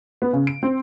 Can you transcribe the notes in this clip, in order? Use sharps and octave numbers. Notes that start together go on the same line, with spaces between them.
B3
C#3
D7
C4